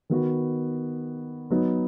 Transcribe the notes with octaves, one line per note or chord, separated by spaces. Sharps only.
D#3 B3 F#4
F#3 B3 D#4